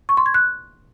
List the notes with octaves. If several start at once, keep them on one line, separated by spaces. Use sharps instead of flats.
C#6
C6
G#6
F#6